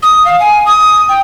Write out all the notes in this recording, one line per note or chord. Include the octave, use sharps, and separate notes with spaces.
D#6
F5
G#5
D#6
G5